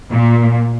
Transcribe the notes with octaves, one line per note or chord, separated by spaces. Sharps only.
A#2